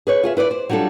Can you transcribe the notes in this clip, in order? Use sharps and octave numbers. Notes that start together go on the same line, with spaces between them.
G#4 B4 C#5
F4 G#4 E5
E4 B4 C#5 D5
C5
F#3 G3 D4 F4 A4